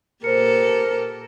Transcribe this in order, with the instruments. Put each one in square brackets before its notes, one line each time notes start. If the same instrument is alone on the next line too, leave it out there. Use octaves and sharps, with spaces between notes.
[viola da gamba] A#2 G4 A4 [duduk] A#4 [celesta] C5 C#7